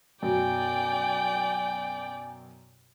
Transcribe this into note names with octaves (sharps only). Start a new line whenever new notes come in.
F#2 B2 D5 G5 G#5